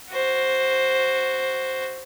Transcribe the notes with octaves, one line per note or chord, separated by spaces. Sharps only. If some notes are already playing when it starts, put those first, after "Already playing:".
F#4 C5